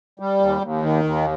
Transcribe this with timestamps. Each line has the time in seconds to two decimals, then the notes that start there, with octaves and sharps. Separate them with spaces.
0.20 G3
0.40 D#2
0.61 D#2
0.83 D#3
1.04 D#2